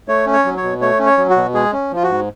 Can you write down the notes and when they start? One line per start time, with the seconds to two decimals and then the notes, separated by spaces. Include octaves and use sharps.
0.08 A3 C#5
0.26 C#4
0.33 C#5
0.45 F#3
0.57 C#5
0.63 B2
0.81 A3 C#5
0.99 C#4
1.06 C#5
1.18 F#3
1.30 F#4
1.36 B2
1.54 G#3 G#4
1.72 C#4
1.91 F3 F4
2.03 F#4
2.09 G#2